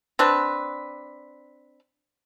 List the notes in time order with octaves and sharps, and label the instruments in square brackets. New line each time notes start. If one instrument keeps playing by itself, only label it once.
[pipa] C4 D4 B4